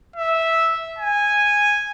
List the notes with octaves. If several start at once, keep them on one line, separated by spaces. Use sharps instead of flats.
E5
G#5